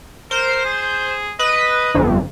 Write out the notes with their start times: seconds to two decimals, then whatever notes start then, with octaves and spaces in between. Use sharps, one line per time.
0.31 A#4 C5
0.65 G#4
1.39 B4 D#5
1.95 G1 F2